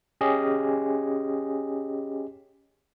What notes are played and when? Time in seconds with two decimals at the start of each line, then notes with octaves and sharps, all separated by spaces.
0.21 C#4 G4 G#4 D#5